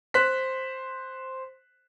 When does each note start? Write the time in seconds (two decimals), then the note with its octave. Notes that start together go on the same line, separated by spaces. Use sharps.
0.14 C5 F#6 B6